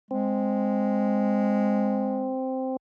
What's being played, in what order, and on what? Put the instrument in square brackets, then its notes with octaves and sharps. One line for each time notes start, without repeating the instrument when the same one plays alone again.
[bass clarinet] G#3 [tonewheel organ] C4